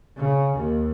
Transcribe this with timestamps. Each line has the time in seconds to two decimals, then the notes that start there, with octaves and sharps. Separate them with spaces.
0.17 C#3
0.57 D#2